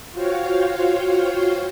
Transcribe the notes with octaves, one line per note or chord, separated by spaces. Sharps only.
F4 F#4 C5 C#5 F5 G5